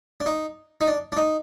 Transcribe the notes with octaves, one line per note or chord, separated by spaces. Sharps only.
D4
D#4
D#4
D4
D4
D#4